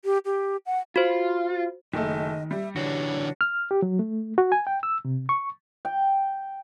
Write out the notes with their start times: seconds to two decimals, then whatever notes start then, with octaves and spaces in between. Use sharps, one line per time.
0.05 G4
0.25 G4
0.66 F#5
0.96 F4 F#4 C5
1.93 F#1 D#3 A3 D#5
2.51 G3 E5
2.76 D3 E3 D4 F#4 C#5
3.41 F6
3.71 G4
3.82 F#3
3.99 A3
4.38 F#4
4.52 G#5
4.67 G5
4.83 E6
5.05 C3
5.29 C#6
5.85 G5